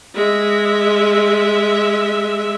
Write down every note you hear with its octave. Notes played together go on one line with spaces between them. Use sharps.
G#3 E5